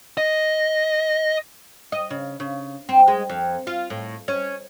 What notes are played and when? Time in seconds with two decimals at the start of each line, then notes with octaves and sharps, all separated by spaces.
0.17 D#5
1.92 D#5
2.10 C#3
2.40 C#3
2.89 C4
3.08 G#3
3.29 F2
3.67 F4
3.90 A2
4.28 C#4